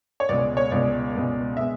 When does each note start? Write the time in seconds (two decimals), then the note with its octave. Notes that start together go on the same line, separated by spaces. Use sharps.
0.20 C#5
0.29 C#2 B2 G#3 D5
0.57 C#5
0.71 C#2 B2 G#3 D5
1.14 C#2 B2 G#3
1.57 B2 G#3 E5